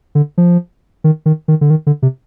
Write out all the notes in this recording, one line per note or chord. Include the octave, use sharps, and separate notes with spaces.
D3
F3
D#3
D#3
D#3
D3
D#3
D3
C3